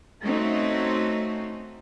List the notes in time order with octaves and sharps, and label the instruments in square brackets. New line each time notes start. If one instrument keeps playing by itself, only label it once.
[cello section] A3 C4 C#4 D#4 F#4